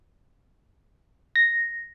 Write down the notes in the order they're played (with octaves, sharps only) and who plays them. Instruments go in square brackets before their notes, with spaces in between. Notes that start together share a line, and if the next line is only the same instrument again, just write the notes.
[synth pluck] A#6